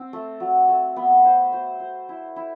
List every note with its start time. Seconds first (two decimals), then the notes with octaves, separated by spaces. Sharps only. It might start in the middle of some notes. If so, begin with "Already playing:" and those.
Already playing: C4
0.13 A3
0.40 F#3
0.69 A3
0.96 B3
1.25 C5
1.53 C5
1.80 C5
2.09 E4
2.36 E4